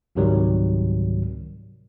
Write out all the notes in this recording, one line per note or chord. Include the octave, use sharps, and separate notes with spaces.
C#2 G#2 C3 D#3 F#3 G3